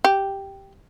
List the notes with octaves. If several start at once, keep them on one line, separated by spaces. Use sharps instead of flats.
G4